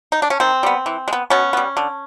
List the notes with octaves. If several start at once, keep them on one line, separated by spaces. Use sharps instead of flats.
D#4
D4
C#4
D#3 C4
G3 B3
E3
G#3
B3
B2 B3 C#4
G3 B3
D3